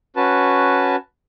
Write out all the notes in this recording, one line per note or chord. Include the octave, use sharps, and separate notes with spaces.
C#4 F#4 B4 A5